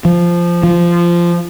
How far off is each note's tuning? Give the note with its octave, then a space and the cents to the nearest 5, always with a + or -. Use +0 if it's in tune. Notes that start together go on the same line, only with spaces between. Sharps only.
F3 -10
F3 -15